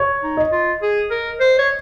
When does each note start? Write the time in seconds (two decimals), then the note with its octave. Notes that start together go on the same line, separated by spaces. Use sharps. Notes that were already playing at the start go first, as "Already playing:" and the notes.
Already playing: C#5
0.23 D#4
0.37 D#5
0.52 F4
0.82 G#4
1.11 A#4
1.40 C5
1.59 C#5